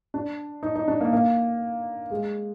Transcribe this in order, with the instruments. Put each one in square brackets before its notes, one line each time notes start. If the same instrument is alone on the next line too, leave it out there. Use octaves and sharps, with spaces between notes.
[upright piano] D4
D#4
D#4
D4
A#3
A#3
G#3